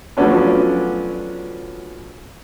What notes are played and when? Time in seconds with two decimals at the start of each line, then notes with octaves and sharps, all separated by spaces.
0.17 F3 F#3 A3 B3 C#4 D4